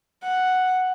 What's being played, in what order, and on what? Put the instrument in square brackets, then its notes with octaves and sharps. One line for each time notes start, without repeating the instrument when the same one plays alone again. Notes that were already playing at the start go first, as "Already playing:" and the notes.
[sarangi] F#5